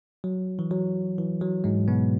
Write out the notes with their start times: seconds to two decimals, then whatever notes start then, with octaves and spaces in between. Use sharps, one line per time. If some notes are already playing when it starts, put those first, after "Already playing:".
0.24 F#3
0.59 E3
0.71 F#3
1.18 E3
1.41 F#3
1.64 G#2 G#3
1.88 B2 B3